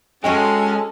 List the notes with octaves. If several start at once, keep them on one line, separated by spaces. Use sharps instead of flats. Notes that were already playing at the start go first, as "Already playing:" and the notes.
G#3 C#4 F#4 A4 D#5 G5 A5